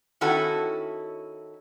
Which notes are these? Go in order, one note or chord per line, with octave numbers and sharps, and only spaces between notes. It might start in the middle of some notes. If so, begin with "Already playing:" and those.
D#3 C#4 E4 F#4 A4